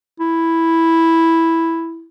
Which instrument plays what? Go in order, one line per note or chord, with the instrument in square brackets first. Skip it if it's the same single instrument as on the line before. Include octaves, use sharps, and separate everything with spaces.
[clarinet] E4